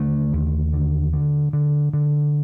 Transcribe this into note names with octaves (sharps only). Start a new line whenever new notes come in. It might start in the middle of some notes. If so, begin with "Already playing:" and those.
Already playing: D#2 D3 A3
D#2
D3
D3
D3
D3